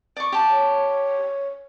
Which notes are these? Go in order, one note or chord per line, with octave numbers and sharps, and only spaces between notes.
D5 C#6
G4 A5
C#5